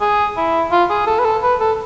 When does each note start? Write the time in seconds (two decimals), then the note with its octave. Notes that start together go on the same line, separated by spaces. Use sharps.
0.01 G#4
0.37 E4
0.71 F4
0.90 G#4
1.07 A4
1.19 B4
1.25 A4
1.43 B4
1.60 A4